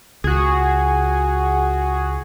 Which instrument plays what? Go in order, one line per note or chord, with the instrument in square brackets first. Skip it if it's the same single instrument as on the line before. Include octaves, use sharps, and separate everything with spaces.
[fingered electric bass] C#2 [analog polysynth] F#4 G#4